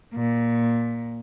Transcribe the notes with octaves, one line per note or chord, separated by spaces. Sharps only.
A#2